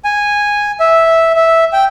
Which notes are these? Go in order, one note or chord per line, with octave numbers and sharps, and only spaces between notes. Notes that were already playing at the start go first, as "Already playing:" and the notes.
G#5
E5
E5
G5